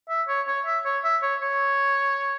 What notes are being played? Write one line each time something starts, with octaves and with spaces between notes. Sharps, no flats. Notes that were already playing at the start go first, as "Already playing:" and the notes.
E5
C#5
C#5
E5
C#5
E5
C#5
C#5